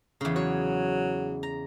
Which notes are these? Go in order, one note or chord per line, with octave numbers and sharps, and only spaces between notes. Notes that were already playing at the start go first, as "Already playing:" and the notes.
E2 C#3
F#3 C#5
A#5